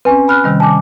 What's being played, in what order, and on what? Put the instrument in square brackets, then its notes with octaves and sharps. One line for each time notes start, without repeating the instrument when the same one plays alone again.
[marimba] C4 C#4 [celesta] B4 G#5
[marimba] B5 F6 F#6
C3 D#3 G3
[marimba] G#5 D6 [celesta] A5